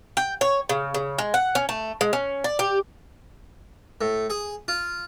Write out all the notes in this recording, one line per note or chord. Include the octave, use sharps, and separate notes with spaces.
G5
C#5
C#3
C#3
G#3
F#5
C#4
A3
G#3
C#4
D5
G4
A2
G#4
F4